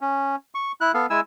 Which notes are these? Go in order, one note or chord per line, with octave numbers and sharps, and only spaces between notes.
C#4
C#6
E4 F#6
B3 A4 F5
G#3 E4 G#5 E6